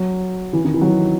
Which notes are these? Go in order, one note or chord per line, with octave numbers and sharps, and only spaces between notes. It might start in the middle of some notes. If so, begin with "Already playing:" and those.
Already playing: F#3
E3
D#3
E3
F#3
E3